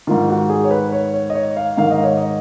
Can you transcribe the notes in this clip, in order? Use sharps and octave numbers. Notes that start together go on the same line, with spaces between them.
G#2 D#3 F4
F#4
G#4
C#5
B4
C#5
C#5
D#5
C#5
F5
G#2 D#3 F5
D#5
C#5
D#5